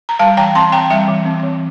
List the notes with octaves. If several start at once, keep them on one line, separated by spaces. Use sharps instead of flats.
A#5
G3 F5 A5
E3 G5 A#5
C4 A5 C6
E3 G5 A#5
G3 E5 G5
E3
C4
E3